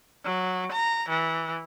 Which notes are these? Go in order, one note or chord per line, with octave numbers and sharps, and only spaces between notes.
F#3
A#5
E3